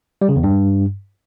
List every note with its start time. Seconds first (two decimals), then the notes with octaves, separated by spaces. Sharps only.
0.21 G3
0.29 C#3
0.36 E2
0.44 G2